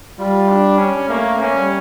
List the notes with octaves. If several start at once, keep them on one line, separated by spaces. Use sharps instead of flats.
G3 F4
D4
C#4
A3 A#3
C#4
G3